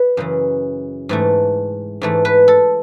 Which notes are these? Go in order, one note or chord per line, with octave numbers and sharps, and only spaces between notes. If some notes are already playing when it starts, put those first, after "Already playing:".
Already playing: B4
F#2 C#3 E3
G#2 E3 A3
G#2 E3 A3
B4
A4